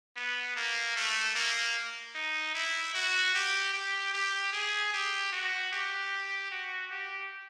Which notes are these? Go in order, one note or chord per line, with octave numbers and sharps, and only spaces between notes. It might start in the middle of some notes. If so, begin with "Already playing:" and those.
B3
A#3
A3
A#3
D#4
E4
F#4
G4
G4
G4
G#4
G4
F#4
G4
F#4
G4